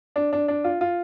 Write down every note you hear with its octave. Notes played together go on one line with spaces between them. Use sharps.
D4
D4
D4
F4
F4